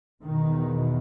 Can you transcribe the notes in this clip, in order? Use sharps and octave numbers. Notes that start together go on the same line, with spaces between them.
E2 B2 D#3